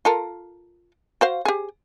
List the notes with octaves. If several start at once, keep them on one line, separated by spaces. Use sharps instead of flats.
F4 A4 A#4
F#4 C5 F5
G4 G#4